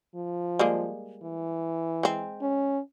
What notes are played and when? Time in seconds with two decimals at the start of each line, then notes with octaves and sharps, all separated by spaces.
0.15 F3
0.59 G3 G#3 A#3
1.23 E3
2.03 G#3 C4
2.42 C#4